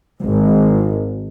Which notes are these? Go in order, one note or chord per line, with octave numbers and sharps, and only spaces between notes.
G#1